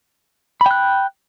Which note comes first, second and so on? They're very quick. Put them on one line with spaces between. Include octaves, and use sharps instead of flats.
B5 G5 F#6